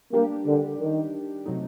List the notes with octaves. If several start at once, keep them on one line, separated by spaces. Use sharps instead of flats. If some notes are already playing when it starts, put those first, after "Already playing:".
G3 A#3 D4 G4
D3
D#3
C3 F#3 A3 D#4